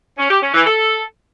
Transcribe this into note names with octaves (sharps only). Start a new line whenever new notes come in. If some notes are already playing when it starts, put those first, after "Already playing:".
C#4
G4
C#4
E3
A4